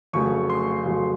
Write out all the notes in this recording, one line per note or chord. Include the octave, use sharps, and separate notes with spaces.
F1 F2 C#3 F#3 A3 C#6
C6
F1 F2 C#3 F#3 A3